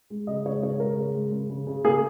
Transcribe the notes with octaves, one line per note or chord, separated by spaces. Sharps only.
G#3
C#3 D#5
G#3 C#5
C#3 C#5
G#3 A#4
C#3
G#3
C#3
C#3
C#3
A#3 G#4